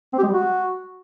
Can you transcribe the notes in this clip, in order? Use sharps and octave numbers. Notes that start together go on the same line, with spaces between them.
C4
G4
G#3
G3
F#4